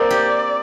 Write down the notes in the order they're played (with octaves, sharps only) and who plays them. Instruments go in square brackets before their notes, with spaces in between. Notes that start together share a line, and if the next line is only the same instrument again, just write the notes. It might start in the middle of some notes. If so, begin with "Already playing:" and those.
Already playing: [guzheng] A#3 C4 [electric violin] D5
[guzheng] G4